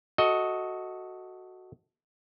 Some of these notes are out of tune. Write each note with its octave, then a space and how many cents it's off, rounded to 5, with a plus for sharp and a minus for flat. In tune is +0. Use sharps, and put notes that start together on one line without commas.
F#4 +0 A4 +0 D#5 +15